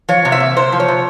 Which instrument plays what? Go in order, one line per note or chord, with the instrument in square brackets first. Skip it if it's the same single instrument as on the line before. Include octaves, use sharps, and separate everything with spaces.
[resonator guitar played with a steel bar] F3 C#5
C3
E5
A#3
C3 C5
F3
C#5
C3